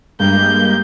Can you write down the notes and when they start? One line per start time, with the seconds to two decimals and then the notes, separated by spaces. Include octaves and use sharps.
0.20 G2 G#3 A#3 G4 G6